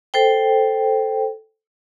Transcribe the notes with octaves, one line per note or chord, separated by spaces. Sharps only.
A4 C5 G5